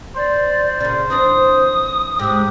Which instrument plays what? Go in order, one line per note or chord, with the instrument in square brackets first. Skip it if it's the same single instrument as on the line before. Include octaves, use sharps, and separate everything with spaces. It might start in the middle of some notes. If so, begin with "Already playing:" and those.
[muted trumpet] C5 [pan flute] D5
[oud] A#2 C#3
[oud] E3 C4 D4 [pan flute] D#6
[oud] G#2 C3 G#3 [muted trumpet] G4